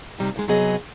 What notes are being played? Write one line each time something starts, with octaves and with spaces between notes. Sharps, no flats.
C3 G3 D#4 G4
G#2 F3 G#3
C3 F#3 B3 G#4 D#5